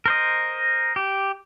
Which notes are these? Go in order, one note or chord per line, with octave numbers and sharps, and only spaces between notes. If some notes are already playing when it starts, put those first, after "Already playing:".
A#4 C5 D#5
G4